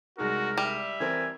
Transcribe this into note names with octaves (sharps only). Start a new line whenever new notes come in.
C2 G#3 D#4 F#4 A#4
G3 E5
E3 C4 A#4 G#5